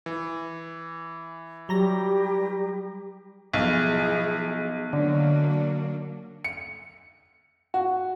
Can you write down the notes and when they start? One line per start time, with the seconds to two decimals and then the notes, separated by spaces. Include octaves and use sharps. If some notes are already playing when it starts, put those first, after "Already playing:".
0.06 E3
1.69 F#3 G3 G4 A#5 A#6
3.54 B1 F3 E4 G#4
4.93 D3 F#3 A#3 D4
6.44 C#7
7.74 F#4